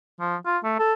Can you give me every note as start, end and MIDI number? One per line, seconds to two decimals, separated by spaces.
0.20 0.36 53
0.46 0.58 65
0.64 0.78 57
0.79 0.93 69